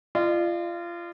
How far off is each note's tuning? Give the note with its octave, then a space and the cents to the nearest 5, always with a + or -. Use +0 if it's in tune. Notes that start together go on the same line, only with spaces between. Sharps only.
F4 -25 D5 +45